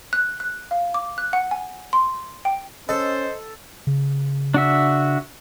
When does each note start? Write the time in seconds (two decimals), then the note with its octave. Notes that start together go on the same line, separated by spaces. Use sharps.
0.13 F#6
0.40 F#6
0.71 F5
0.94 D6
1.18 F#6
1.33 F#5
1.51 G#5
1.93 C6
2.45 G5
2.89 C#4 A4 C5 D#5
3.87 C#3
4.54 D4 F#4 E5